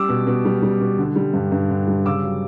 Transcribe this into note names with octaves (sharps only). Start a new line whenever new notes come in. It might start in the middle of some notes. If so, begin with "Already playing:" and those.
Already playing: G3 D6 E6
B2
B2
G3
G3
B2
D3
G3
G2
G2
D3
G3
C#3 D6 E6
F#3